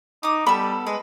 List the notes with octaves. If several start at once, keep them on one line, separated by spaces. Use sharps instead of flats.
D#4 D6 D#6
G3 B3 A4 B5
G#3 B4